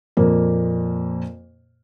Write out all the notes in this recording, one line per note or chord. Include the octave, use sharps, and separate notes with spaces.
F2 A#2 A#3